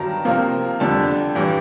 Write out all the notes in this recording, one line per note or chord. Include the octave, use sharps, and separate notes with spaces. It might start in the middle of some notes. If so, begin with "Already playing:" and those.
Already playing: G2 D#3 F#3 A5 A#5
C3 F3 A#3
F2 D3 G3 A5
G2 E3 G3